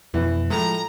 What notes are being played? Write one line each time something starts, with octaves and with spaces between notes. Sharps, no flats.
F2 B2 E3
A2 F3 G#3 A#5